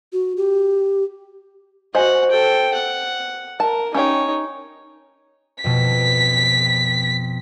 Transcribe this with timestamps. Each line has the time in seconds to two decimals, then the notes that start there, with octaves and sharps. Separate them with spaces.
0.13 F#4
0.37 G4
1.95 F#4 C5 D#5 F#5 G#5
2.31 A4 G5
2.74 F#5
3.60 A#4 A5
3.95 C#4 D#4 G4 C#5 G5
5.64 F2 B2 B6